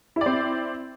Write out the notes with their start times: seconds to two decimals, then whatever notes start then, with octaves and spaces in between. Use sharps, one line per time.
0.16 E4
0.21 D5
0.26 C4